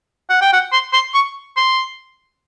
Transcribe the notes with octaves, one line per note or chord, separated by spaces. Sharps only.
F#5
G5
F#5
C6
C6
C#6
C6